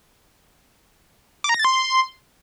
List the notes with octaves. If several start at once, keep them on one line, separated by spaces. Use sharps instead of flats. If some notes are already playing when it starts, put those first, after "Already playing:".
D6
A#5
A#6
A6
C6